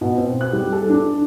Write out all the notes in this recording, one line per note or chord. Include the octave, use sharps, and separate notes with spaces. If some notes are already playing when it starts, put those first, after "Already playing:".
B2
C4
F#6
G3
A4
D4